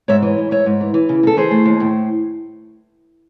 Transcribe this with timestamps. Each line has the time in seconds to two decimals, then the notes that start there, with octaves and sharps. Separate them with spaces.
0.08 G#2 C#5 E5
0.22 E3
0.38 G#2
0.51 G#2 C#5 E5
0.66 G#2
0.81 E3
0.94 E3
1.09 C#3
1.23 C#3 A4
1.37 E3 G#4 C5
1.51 A3
1.65 D#2
1.80 A2